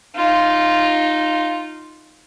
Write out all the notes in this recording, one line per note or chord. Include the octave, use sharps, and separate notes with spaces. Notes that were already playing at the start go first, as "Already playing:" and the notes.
D#4 F4